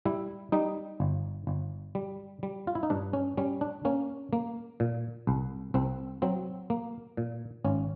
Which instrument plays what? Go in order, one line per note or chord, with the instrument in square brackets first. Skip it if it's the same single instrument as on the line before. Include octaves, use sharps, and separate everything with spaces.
[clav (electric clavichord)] G3 E4
G3 D#4
G1
G1
G3
G3
F4
E4
D#4
G2 D4
C#4
G3 C#4
D4
A#3 C#4
A#3
A#2
C2
C2 C4
F#3 C4
A#3
A#2
G#1 C#4